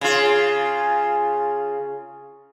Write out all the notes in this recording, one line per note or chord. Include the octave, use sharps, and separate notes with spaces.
C#3 F4